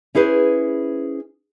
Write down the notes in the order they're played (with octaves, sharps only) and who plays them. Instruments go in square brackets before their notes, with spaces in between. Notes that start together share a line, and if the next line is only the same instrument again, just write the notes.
[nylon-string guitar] C#4 E4 G#4 B4 C5